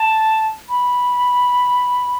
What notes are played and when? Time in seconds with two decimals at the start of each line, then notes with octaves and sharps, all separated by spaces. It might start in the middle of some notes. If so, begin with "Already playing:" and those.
Already playing: A5
0.69 B5